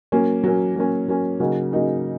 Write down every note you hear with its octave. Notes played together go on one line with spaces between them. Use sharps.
F#3 A#3 C#4
F#3 A#3 C#4
F#3 A#3 C#4
F#3 A#3 C#4
C#3 F#3 A#3 D#4 F#4
C#3 F#3 A#3 D#4 F#4